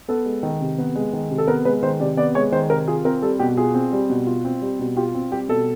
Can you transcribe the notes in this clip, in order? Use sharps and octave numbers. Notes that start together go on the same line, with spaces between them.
B3 A4
G#3
D#3
C3
B3
G#3
D#3
C3
A4
B3 A#4
G#3 B4
D#3 C5
C3 D5
B3 D5
G#3 C#5
D#3 C5
C3 A#4
F4 G#4
C4 A#4
G3 A4
B2 G4
F4 G#4
C4
G3
B2
F4
C4
G3
B2
F4 G4
C4
G3 G4
B2 A4